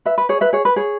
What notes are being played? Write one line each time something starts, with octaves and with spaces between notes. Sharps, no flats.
B4 E5
B4
G#4 C#5
B4 E5
G#4 C#5
B4
G#4 C#5